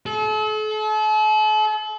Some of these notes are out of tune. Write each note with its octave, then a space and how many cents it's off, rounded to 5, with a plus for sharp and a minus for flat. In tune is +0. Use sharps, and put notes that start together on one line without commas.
A4 -40